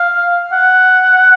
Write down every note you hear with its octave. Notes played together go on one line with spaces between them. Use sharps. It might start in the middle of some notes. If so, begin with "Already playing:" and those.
Already playing: F5
F#5